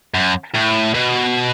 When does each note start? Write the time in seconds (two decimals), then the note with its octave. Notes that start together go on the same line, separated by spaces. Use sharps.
0.14 F#2
0.54 A2
0.94 B2